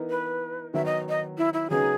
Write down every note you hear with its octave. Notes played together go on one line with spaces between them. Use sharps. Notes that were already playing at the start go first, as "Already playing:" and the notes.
Already playing: E3 B3 D#4 A#4
B4
D#3 F#3 B3 E5
D#5
D#5
E4
E4
C#3 F#3 B3 D#4 G#4